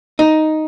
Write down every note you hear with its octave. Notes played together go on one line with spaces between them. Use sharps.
D#4